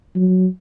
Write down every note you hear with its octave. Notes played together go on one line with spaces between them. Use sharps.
F#3